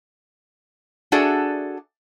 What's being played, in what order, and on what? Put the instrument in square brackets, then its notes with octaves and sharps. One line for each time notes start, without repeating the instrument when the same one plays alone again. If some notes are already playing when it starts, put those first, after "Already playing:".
[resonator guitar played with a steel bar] D4 F#4 G#4 A4 D5 E5